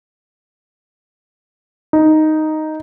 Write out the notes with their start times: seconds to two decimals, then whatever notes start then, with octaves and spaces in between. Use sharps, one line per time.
1.93 D#4